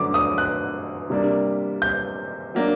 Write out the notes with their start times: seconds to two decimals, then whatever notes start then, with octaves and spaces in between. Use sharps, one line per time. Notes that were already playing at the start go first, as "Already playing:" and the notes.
Already playing: F#2 D3 F#3 A3 D6
0.14 D#6
0.38 F#6
1.10 C3 G3 A#3 D4
1.82 G6
2.55 F#3 A#3 D4